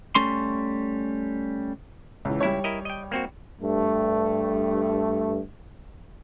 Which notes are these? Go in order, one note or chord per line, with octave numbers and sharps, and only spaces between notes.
G3 A3 C#4 C6
C#2 E3
C#2 G3 E4 C#5
E4 A#4 D#5
D#5 G5
A#3 C4 F#4
G2 A3